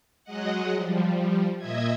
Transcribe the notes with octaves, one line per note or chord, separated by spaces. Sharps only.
F#3 G#3 D#5 F#5
F3 G3
A#2 D#5 E5 G#6